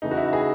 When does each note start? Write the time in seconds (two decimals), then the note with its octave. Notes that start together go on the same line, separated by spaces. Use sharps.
0.02 C#3 E3 A3 D#4
0.11 F#4
0.17 E4
0.33 G#4